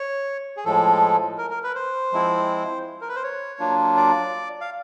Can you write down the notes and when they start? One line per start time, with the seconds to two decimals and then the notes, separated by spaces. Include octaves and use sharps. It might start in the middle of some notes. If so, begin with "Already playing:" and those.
Already playing: C#5
0.57 G#4
0.65 A2 F3 G#3 A4
1.38 A#4
1.50 A#4
1.64 B4
1.75 C5
2.12 F3 G#3 C4 E4
3.01 A#4
3.09 B4
3.16 C5
3.23 C#5
3.59 F#3 A#3 D4 F4
3.97 D5
4.61 F5